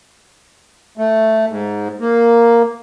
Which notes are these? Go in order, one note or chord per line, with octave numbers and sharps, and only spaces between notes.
A3
G#2
A#3